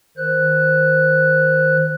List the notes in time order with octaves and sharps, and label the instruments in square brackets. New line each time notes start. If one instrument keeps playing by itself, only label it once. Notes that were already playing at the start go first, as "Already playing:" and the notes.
[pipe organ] D#3 C5 F#6